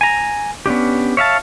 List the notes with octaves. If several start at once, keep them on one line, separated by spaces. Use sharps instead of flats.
G#5 A#5
B3 C#4 D4 G4
C#5 E5 F5 A5